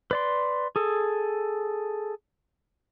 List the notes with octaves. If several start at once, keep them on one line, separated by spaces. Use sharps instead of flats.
B4 D5 C6
G#4 A4